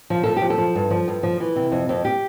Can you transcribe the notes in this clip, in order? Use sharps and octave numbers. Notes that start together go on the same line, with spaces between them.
F3
F3 A4
F3 G4
A4
F3
G2
F3
G2
F3
E3
C3
F2
F2
G4